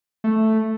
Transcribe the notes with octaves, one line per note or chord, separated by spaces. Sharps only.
A3